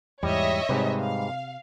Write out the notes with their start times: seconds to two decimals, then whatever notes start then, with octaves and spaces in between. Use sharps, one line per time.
0.23 E2 G#2 G3 C#5 D#5 E5
0.69 G#2 C3 G3 B4
0.99 F5